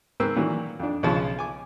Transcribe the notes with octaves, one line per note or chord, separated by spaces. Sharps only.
G#2 C4 A#4 B4 E6
A#2 D#3 E3 F#3
F2 D4
B1 C#3 F3 C#4 C6
G#5 D6